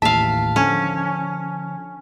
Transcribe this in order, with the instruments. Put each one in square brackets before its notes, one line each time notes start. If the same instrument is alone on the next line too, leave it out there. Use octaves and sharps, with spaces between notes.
[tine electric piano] A1 D#2 A2 [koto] E5 F5 [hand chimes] A5
[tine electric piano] D3 F3 [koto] C#4